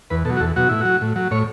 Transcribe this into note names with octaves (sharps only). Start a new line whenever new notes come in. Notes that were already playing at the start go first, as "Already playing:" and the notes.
E2 B4
B2 A4
F#3
F#4
E2 A4
B2 F#3 F#4
A2 E4
F#3 F#4
A2
F#3
A2 C#5